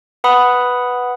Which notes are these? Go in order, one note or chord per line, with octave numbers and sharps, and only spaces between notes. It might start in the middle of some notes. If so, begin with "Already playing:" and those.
B4 F#5 B5 D#6